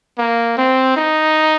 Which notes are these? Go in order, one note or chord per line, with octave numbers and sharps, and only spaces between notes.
A#3
C4
D#4